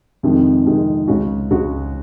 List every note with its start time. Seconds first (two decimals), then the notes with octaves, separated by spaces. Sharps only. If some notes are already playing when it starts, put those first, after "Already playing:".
0.23 F2 C3 D#3 G#3
0.65 F2 C3 D#3 G#3
1.08 C#2 C#3 G#3 C#4 F#4
1.51 C#2 C#3 G#3 C#4 F#4